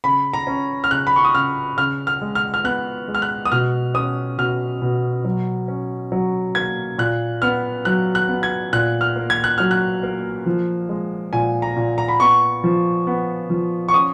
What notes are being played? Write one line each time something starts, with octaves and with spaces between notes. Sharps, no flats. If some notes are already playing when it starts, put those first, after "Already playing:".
C#3 B5
A#5
C#4
F6
C#3 F#6
B5
C#6
D#6
C#3 F6
C#3 F6
F6
G#3
F6
F6
B3 F#6
G#3
F6
F#6
D#6
B2 F6
C#4 D#6
B2 F6
B2
F#3
C#4
F#3
A#3 G#6
A#2 F#6
B3 F6
F#3 F#6
F#6
B3
G#6
A#2 F#6
F6
A#3
G#6
F#6
F#3 F6
F#6
A#3
F3
G#3
A#2 G#5
A#5
A#2
A#5
B5
B3 C#6
F3
B3
F3
C#6
C#4 D#6